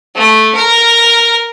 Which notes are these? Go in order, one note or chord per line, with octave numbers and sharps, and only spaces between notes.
A3
A#4